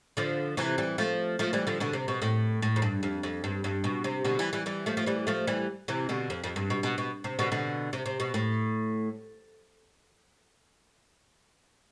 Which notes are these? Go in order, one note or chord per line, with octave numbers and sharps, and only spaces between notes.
D3 F3
C3 E3
E3 G3
F3 A3
F3 A3
E3 G3
D3 F3
B2 D3
C3
B2
A2
A2
F2
G2
F2
F2
G2
G2
B2
C3
B2 D3
E3 G3
E3 G3
E3 G3
F3 A3
F3
E3 G3
F3 A3
E3 G3
C3 E3
B2 D3
F2
F2
G2
B2
B2
B2
C3
B2 D3
B2 D3
C3
C3
B2
A2